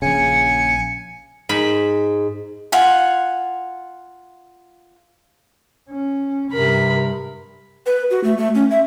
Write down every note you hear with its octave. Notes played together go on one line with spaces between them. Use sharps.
A#1 C#3 G#5 C#7
G#2 B5
F4 F#5 G#5
C#4
G2 C3 A#4 B5
B4
F#4
A3
A3
C#4
E5